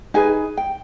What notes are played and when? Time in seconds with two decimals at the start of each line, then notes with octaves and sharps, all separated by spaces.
0.14 D#4 G#4 B4 G#5
0.57 G5